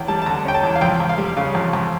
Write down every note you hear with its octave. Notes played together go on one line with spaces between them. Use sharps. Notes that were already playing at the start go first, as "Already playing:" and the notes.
Already playing: E2 C#4 G5
G3 A5
A5
D3 A#5
C#4 G5
A5
E2
F5
F2 G5
F2
F5
G3
C#3 F5
F2
F2